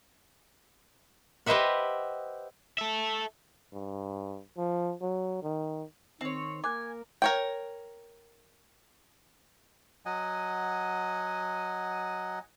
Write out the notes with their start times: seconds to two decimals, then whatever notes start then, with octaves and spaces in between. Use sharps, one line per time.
1.46 G4 B4 C5 D#5 E5 F#5
2.78 A4 E5
3.73 G2
4.57 F3
5.01 F#3
5.43 D#3
6.21 D#3 C4 C#5
6.64 A#3 A#4 G#5 D6 F#6
7.22 A#4 C#5 G5
10.06 F#3 D#5 F#5 G#5